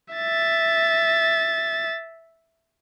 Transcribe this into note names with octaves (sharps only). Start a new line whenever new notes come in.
E5 A6